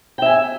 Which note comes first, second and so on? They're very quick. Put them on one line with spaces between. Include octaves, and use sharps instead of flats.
G5 E5 G#5